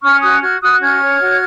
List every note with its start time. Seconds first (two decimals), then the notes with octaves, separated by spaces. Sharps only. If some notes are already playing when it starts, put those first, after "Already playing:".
0.02 C#4 C#6 F6
0.21 F#4 D#6 F#6
0.41 F#4 F6 G#6
0.60 F#4 D#6 F#6
0.80 C#4 F6 G#6
1.01 C#5
1.20 F#4